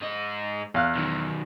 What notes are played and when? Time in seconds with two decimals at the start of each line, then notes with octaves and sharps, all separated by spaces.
0.01 G#2 D#5
0.74 E2 F5 F#6
0.95 B1 D#3